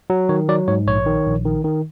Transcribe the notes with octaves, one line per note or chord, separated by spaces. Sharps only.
F#3
D#3 C#5
F#3 D5
G#2 C#5
A#1 C#5
D#3
A#1
D#3
D#3